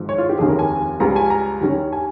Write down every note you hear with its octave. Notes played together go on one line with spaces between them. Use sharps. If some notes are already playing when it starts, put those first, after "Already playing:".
Already playing: G#1 G#2 F3
C#5
F4
G4
F1 D#2 D#3 G#3 C#4 G#4
A#4
G#5
C#2 C#3 G3 A#5
G#5
A#5
D#2 D#3 G3 C#4
G#5